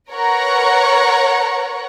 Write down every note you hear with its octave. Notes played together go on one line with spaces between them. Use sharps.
A#4 B4 C#5 F#5 A#5 C#6